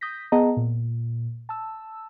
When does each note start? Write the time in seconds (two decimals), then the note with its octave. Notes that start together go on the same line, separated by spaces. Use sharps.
0.01 D#6 G6 A#6 B6
0.32 B3 G#4 D#5 F#5 A5 A#5
0.57 A#2
1.49 A5 E6